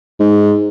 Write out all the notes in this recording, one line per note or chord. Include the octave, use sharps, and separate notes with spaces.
G#2